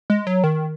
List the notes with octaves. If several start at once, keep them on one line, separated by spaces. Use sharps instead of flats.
G#3
F#3
D#3